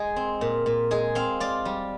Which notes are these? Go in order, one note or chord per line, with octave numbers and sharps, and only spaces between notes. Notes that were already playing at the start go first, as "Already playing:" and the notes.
Already playing: G#3 G#4
C4
A#2
A#2
G#3 G#4
C4 F5
F4 D5
G3